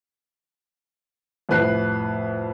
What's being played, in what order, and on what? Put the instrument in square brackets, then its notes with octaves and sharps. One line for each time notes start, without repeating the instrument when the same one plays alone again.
[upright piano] C2 F2 A2 B4 F#6 C7